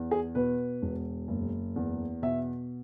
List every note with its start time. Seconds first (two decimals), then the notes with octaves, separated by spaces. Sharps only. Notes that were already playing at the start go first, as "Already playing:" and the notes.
Already playing: E2
0.11 G#4
0.35 B2 B4
0.82 E1
1.28 F#1
1.76 E2
2.22 B2 E5